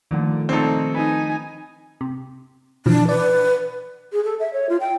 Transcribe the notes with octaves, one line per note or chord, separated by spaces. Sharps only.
A#2 D3 D#3 F3 A3
C2 A#2 C4 D#4 A4
D#4 B4 G#5
C3
B2 E3 F3 D4
B4 D5
G#4
A4
E5
C#5
F4
G5